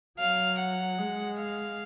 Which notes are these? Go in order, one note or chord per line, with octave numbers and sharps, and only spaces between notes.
F#3 F5
F#5
G#3
F5